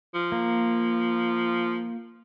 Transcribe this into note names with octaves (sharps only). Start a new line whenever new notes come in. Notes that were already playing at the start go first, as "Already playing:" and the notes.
F3
A#3